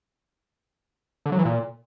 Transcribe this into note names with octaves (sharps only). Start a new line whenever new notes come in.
D3
F#3
E3
A#2